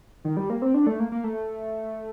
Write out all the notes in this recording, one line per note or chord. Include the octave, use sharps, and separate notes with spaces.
D#3
G3
A#3
C4
D4
A3
A#3
A#3
A3